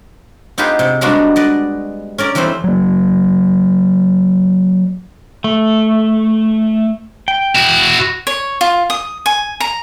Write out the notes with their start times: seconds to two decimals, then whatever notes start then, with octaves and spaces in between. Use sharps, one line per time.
0.58 B3 D#4 F4 G4 G#4 B4
0.79 C3
1.01 G3 G#3 A#3 B3 D4 F#4
1.36 B4 D5 D#5
2.18 C#4 A#4 D5
2.35 E3 G3 A3 C4 C5
2.64 F#3 A#3
5.44 A3
7.28 G5
7.55 E4 F#4
8.27 C#5
8.61 F4
8.90 D#6
9.26 G#5
9.60 A#5